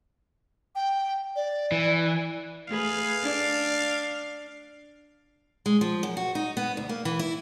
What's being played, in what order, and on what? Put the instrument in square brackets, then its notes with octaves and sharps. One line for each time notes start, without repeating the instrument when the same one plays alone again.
[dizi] G5
D5
[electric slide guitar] E3
[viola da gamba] A3 G#4 B4 [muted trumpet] F5
[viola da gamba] D4
[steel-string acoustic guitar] G#3
F3
F#2
F#4
D#4
B3
D2
A#3
E3
E4